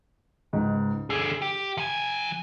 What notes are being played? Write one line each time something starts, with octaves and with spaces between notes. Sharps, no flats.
C#2 G#2
D3 G#4 E6 D7
G4
F3 G#5